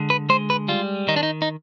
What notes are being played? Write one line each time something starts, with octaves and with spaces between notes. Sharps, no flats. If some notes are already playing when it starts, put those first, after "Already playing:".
Already playing: D3 G#3
B4
G#3 C5
B4
G3 F4
D#3 D#4
D4
D#4
D#4